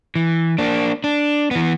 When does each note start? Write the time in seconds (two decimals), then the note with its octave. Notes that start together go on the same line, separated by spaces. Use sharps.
0.16 E3
0.58 A#3 D4
1.04 D4
1.51 E3 B3